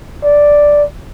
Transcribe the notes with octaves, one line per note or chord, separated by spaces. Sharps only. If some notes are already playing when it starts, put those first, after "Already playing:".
D5